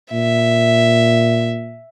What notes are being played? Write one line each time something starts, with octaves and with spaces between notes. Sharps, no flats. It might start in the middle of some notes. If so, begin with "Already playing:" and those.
A#2 E5